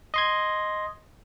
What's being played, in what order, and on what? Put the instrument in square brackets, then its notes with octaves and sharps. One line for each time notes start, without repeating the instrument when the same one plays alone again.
[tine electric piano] D#5 C6 G#6